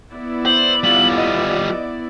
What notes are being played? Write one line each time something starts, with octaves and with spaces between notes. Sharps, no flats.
B3 E4 D5
C5 F#7
G3 F4 F#7
D#5